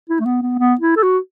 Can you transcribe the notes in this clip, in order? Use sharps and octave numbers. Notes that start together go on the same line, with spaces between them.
E4
A3
B3
B3
B3
E4
A4
F#4